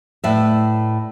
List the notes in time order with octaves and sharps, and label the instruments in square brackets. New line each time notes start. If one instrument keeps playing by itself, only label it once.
[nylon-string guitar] A2 B4 D5 E5